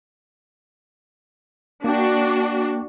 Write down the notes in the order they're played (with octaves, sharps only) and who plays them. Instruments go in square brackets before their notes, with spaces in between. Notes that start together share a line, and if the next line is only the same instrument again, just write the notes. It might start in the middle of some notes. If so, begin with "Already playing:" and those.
[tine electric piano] A#3 G5 [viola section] D4 F#4